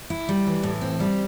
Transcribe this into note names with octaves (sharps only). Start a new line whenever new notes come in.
E4
G3
E3
A2
C4
G3